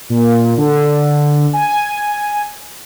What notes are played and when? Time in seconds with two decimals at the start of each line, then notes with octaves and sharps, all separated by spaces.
0.10 A#2
0.57 D3
1.53 G#5